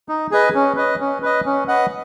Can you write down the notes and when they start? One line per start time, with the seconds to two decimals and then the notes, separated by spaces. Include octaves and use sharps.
0.09 D#4
0.31 G#4 B4 D#5
0.55 C#4
0.76 B4 D#5
1.00 C#4
1.22 B4 D#5
1.46 C#4
1.68 B4 D#5 F#5